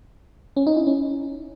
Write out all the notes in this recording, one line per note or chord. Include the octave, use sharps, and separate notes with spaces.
C#4
D#4
E4
C#4